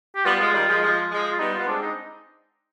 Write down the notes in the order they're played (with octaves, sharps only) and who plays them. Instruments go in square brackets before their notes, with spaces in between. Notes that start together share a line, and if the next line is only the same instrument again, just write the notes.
[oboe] G4
[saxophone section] G3 B3 [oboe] F4
[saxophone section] F3 G#3
D#3 G3
F3 G#3
F3 G#3
F3 G#3
[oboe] F4
[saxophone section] G3 B3 [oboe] D#4
[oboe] F4
[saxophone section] B3
[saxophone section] G#3 C4 [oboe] D4
[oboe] D#4